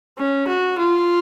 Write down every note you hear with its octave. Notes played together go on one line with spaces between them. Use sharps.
C#4
F#4
F4